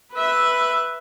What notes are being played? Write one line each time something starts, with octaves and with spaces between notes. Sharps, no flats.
B4 E5